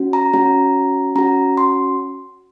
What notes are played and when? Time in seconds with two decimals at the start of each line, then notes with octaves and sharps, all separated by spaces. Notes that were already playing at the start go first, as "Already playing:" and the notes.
Already playing: C#4 F#4
0.13 A#5
0.33 C#4 F#4 A#5
1.15 C#4 F#4 A#5
1.57 C6